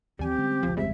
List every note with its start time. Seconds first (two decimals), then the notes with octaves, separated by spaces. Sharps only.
0.19 D#2 E3 F3 G3 C4 G4 G#5
0.38 D3 G#3 C#4
0.63 D#1 C#2 F3
0.77 G1 E2 C#3 G3 G#3 C4 E5